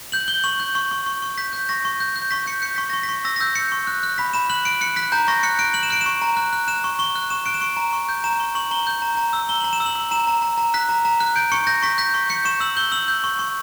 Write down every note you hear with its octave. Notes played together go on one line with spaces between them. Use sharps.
G6 F#7
G6 G7
C#6 F#7
G6
C#6
C#6
C#6
C#6
G6 B6
G6
C#6 A#6
C#6
G6
G6
C#6 B6
G6 C#7
G6 C#7
C#6 B6
C#6 A#6
B6
C#6
E6 A#6
A#6
E6 G6
G6 C#7
C#6
F#6
F#6
B5 B6
B5 E7
F#6 F#7
F#6 D7
F#6 C#7
F#6 B6
A#5 G6
C#6 A#6
F#6 C#7
F#6 D7
F#6 F#7
E7
F#6 D7
E7
C#6
A#5
F#6
F#6
F#6 E7
C#6
C#6 G7
F#6
C#6 E7
F#6 D7
E7
C#6 D7
A#5
C#6
G6
A#5 E7
C#6
C#6 F#7
A#5 G7
G6
A#5
A#5
E6
A#5 G7
A#5 F#7
E7
E6
F#7
E6
A#5 E7
A#5
A#5
A#5
F#6 B6
A#5
A#5
F#6
G6 D7
C#6 C#7
G6 A#6
C#6 B6
G6 B6
C#6
G6 C#7
C#6 E7
E6 F#7
G6 G7
E6 F#7
G6
C#6
C#6